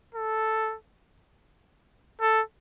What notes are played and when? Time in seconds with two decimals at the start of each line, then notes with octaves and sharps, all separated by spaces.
0.14 A4
2.21 A4